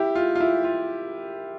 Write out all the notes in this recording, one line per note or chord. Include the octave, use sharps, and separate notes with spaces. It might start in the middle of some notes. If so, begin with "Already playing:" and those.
Already playing: E4 G4
F4
F4
E4
F4